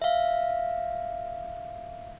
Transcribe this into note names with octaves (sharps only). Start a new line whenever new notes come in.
E5 F5